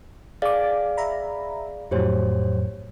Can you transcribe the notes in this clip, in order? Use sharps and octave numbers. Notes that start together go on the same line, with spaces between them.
G#4 D5 F5 D6 A6
E5 A#5 B5
F2 A2 F#3 G4 C5 C#5